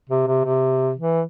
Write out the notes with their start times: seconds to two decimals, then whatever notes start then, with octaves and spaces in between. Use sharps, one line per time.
0.09 C3
0.27 C3
0.45 C3
0.98 E3